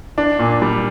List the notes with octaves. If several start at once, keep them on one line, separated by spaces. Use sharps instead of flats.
D4
A#2
G3